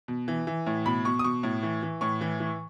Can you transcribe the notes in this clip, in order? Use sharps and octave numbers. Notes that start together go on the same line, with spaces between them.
B2
E3
E3
A2
B2 B5
B2 C#6
D#6
B2 C#6
A2
E3
E3
A2 C#6
E3
E3